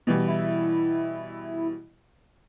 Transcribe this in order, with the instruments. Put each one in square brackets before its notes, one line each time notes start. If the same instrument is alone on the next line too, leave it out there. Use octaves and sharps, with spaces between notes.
[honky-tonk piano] B2 E3 G3
[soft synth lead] E4